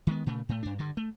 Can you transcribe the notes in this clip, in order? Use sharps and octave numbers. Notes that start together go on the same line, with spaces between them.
D#3 G#3 B3
A#2 C#3 A3
A2 A3
G2 D4
G2 D3
A3